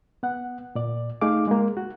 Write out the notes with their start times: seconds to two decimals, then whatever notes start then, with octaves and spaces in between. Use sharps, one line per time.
0.23 B3 F#5
0.75 A#2 D5
1.21 A3 D#4 G#4 F5 D6
1.48 G#3 A#3
1.77 F#4